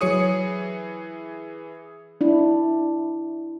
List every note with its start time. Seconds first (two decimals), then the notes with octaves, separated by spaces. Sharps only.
0.01 E3 F#3 G#4 C#5 D#6 C#7
2.21 D4 E4